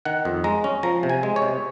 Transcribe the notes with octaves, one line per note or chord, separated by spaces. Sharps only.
D#3 F#5
F2
G#3 A#5
C#4
F3 A#5
C3
G#5
G#3
C#5
C3